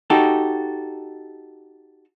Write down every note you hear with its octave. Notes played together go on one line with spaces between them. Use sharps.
D#4 F#4 G4 A4